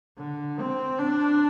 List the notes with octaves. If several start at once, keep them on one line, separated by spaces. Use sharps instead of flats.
D3
C4
D4